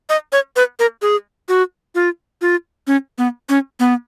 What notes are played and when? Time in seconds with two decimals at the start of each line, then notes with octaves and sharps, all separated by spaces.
0.09 D#5
0.32 C#5
0.56 B4
0.79 A#4
1.02 G#4
1.49 F#4
1.95 F4
2.41 F4
2.87 C#4
3.18 B3
3.49 C#4
3.80 B3